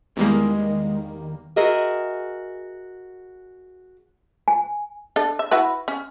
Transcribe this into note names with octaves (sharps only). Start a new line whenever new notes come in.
E2 D#3 G3 G#3 A#3
F#4 G#4 A#4 D#5 E5
G#5
D4 A4
E5
E4 F#4 B4
C#4